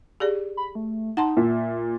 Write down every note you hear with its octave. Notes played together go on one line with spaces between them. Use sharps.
G4 G#4 D5
B5
A3
D#4 F#5 A5 C6
A#2 E5